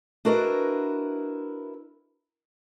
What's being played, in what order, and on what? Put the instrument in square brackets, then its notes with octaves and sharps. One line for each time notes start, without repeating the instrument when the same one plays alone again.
[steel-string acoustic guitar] D4 E4 F#4 A#4 B4 D#5